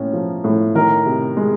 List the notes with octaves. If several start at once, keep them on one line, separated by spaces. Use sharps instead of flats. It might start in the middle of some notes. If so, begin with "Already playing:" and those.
Already playing: A2 A#3 C#4
F3
A2
D#3 A#4
C3
G#3